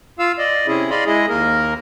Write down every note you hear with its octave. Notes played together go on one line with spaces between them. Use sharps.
F4 F5 E6
D5 D#5
C3 C#4 E4 G#4
D5 D#5 F5 B5 C6
G#3 E4 G#4 D#5
D#2 A#3 A#4